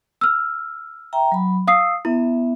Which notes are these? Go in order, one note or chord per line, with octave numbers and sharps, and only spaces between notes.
E6 F6
E5 G5 A#5
F#3 B5
F5 D#6 E6 C7
B3 E4 E5